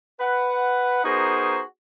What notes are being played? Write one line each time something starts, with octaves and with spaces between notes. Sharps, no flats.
B4 F#5
B3 D#4 F#4 G#4 A#4 C5